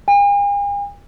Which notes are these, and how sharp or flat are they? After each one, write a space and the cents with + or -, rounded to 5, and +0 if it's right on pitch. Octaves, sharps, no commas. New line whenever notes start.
G#5 -45